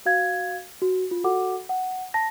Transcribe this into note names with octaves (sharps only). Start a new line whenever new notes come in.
F#4 F5 G#6
F#4
F4
F#4 A4 F#5 D6
F#5
A5 A#6